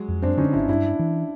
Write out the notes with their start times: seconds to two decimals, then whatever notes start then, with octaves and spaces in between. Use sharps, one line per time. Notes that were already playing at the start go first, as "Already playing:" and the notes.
Already playing: F#3 G#3
0.08 F2
0.22 F#2 C4 D4
0.38 D3 C#4 D#4
0.53 G#1 D4 E4
0.69 G2 D4 E4
0.84 C#4
0.99 E3